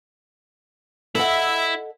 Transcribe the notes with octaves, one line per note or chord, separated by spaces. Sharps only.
E4 A4 D#5 E5 F#5